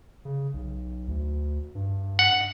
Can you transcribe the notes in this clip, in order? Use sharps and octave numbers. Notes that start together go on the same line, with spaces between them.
C#3
B1
D2
G2
F#5